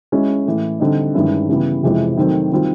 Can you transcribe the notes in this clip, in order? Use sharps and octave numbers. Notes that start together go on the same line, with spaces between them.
G#3 C#4 E4
A2 E3 A3
D3 G3 C4 D#4
G2 D#3 G#3 C#4 E4
C#3 E3 G3 B3
F2 C3 E3 G#3 C4
D#3 F#3 A3 C4
D#3 G3 C4 F4